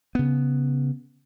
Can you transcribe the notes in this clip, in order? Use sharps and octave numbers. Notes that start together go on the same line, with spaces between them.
C#3 B3